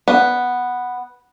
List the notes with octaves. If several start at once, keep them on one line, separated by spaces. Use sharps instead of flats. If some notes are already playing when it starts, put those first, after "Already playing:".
B3